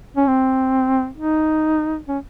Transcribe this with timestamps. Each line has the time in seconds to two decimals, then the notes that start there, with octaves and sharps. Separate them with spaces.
0.17 C#4
0.27 C4
1.17 D#4
2.08 C#4